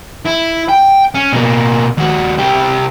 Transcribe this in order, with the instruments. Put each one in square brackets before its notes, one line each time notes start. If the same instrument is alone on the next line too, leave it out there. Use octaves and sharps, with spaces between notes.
[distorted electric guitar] E4
G5
C#4
B2 A#3
D#2 F#4
C2 G4